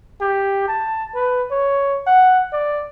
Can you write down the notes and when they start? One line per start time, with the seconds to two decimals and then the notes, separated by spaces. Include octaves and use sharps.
0.21 G4
0.68 A5
1.15 B4
1.51 C#5
2.07 F#5
2.52 D5